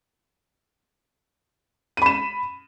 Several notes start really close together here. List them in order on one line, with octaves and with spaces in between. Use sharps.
D#7 B5 E7